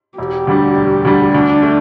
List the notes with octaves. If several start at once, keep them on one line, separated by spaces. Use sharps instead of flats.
E1 G4
D2 D3 G3 D4
E1
D2 D3 G3 D4
D2 D4
A3